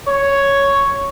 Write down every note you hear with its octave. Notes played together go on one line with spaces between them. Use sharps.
C#5